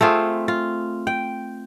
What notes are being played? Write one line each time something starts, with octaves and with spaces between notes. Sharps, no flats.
A3 C4 F4 G#4
F4
G5